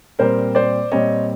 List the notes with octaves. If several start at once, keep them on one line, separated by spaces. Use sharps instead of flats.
A#2 G3 C4 A#4 C5
C5 D5
A#2 G3 C4 C#5 D#5